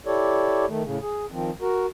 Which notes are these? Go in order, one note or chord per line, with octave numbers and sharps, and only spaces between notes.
E4 G4 A4 C#5 D5
D#3 A3
A2 C#3
G#4
D#3 F3 C4
F#4 A#4